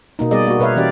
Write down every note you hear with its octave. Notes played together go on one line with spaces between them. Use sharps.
B2 A#3 D#4
G3 B3 G#4 D5 D#5
A#3 F#4
B2 B4 C#5 E5 F5
E3 C#4 G4 D5